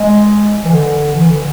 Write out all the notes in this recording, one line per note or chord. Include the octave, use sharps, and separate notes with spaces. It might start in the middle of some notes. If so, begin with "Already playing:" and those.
Already playing: G#3
E3
D3
E3
D3